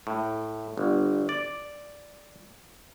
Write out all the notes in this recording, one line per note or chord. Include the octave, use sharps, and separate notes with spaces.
A2
G1
D5